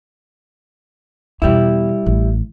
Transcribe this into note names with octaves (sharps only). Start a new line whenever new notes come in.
E2 B2 G3 E4
A1